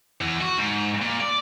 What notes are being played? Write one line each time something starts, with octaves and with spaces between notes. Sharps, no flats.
E2
F#4
G#2
A#2
D5